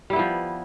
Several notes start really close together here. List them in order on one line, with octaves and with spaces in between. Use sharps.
G3 E4 B3 F3